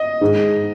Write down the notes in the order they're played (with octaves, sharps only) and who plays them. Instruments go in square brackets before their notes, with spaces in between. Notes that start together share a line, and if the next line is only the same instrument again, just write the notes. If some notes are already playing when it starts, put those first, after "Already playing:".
Already playing: [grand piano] D#5
[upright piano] G#2